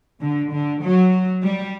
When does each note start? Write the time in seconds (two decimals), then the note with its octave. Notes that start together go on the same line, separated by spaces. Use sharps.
0.20 D3
0.51 D3
0.82 F#3
1.43 G3